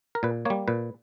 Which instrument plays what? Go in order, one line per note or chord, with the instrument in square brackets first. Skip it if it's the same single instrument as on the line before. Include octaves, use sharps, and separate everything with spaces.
[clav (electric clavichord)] A#4
A#2 B4
G3 A#3 C#5
A#2 B4